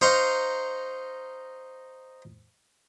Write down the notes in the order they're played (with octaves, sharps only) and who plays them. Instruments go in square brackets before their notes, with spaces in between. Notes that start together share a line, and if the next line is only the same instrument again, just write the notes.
[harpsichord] D#4 C5 F5 A#5 C#6